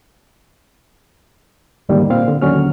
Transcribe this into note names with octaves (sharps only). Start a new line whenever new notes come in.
D#2 G#2 D3 D#3 G3 A#3
A#2 C4 F5
D3
D#2 D3 F#3 C#4 F6